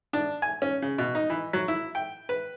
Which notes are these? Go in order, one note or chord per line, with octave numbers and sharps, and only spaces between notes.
D4
G#5
C#4
C#3
B2
D#4
E3
F#3
E4
G5
B4